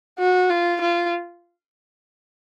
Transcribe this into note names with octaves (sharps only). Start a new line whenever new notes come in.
F#4
F4
F4